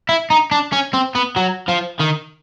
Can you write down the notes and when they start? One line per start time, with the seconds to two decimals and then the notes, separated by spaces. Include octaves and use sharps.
0.09 E4
0.30 D#4
0.51 D4
0.72 C#4
0.93 C4
1.15 B3
1.36 F#3
1.68 F3
1.99 D#3